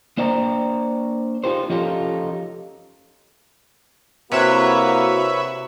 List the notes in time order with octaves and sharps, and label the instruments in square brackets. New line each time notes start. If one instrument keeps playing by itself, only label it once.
[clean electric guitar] A#3 D4 C5 D5 G5 A#5
D#4 F4 G4 C5
F3 C#4 D#4 F4 G4 A4
[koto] C3 [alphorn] A#3 [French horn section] E4 F#4 [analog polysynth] B4 C#5 E5